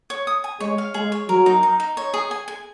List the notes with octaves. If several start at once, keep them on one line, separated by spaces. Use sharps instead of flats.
C#5
D#6
G#5
G#3 C#5
F5
G#3 G#4
C#5
F#3 A#4
D#4
D#4
D#4
C#5
G#4
G#5
G#5